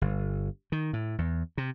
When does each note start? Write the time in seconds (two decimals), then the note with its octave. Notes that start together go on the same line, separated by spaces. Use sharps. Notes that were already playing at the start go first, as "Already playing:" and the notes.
0.01 G1
0.72 D#3
0.93 A2
1.18 E2
1.58 C3